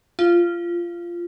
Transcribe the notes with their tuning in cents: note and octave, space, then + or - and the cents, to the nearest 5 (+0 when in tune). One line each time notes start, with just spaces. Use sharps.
F4 -15